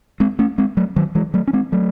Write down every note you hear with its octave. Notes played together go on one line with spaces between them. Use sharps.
G#3 C4
A3 C#4
G#3 C4
F#3 A3
D#3 F#3
E3 G#3
F#3 A3
C#4
G#3 C4
F#3 A3